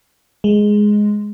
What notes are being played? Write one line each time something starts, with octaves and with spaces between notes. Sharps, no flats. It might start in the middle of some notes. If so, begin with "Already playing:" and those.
G#3